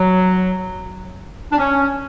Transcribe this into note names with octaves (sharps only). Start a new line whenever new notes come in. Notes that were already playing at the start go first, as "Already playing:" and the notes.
Already playing: F#3
D4
C#4